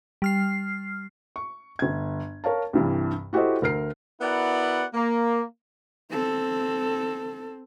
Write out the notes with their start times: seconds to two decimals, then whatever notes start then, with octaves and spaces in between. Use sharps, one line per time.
0.22 G3 F6 C7
1.36 C#6
1.79 G1 G#6
2.44 A#4 C#5 F5 A5
2.73 C2 G2 E3
3.33 E4 F#4 G4 A4 C5 D#5
3.62 D2 A#4 F6 C7
4.21 B3 E4 F#4 A#4 D5 F#5
4.94 A#3
6.10 C4 A4